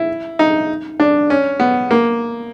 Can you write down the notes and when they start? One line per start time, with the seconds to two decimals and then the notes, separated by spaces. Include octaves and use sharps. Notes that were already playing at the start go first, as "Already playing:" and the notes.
Already playing: E4
0.39 D#4
1.00 D4
1.30 C#4
1.60 B3
1.91 A#3